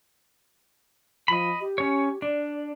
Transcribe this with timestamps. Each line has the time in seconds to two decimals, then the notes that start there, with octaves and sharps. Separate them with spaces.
1.28 F3 D#5 B5
1.61 G4
1.78 C#4 C#5
2.22 D4 D5